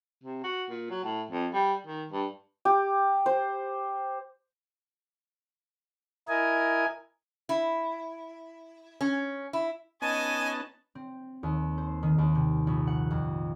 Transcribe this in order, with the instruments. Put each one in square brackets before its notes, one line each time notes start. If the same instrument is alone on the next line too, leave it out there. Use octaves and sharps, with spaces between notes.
[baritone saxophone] C3
F#4
A#2
F#3
A2
F2
G3
D#3
G2
[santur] G4
C5
[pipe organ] E4 A#4 D#5 G#5
[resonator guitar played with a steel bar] E4
C#4
E4
[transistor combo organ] B3 C#4 D#4 [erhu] D#5 [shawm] G#5 [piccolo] A5
[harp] C4
D#2
C5
D#3
D#2
C3
A#1
F#5
F2